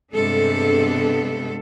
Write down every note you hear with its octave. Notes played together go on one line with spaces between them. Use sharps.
G2 C3 G#3 B3 D4 A4